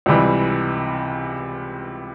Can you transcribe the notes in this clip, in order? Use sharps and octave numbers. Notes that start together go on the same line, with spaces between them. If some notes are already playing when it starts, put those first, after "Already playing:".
C#2 C3 E3 G3